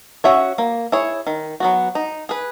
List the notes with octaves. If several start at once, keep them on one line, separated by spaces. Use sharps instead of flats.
C#4 F#4 C#5 E5
A#3
E4 G#4 C#5
D#3
F#3 B3 F#4
D#4
G#4 B4